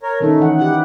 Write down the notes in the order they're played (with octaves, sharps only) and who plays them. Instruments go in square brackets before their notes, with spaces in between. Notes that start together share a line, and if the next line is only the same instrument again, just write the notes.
[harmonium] A#4 C#5
[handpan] D#3 C#4 D#4 [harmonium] A3
[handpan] E3 F#5
[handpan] E4 G4 [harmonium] F#5